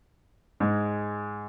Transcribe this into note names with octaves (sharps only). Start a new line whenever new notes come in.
G#2 G#3